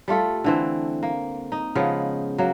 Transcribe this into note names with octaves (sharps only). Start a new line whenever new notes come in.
G3 A3 F4 A4
D3 E3 C4
A#3
D#4
C#3 F3 G#3 B3
F#3 A#3